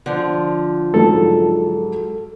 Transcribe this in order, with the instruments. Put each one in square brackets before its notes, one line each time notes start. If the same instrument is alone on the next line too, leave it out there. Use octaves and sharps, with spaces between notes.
[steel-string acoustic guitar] D3 F3
[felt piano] G#2 F#3 [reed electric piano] A4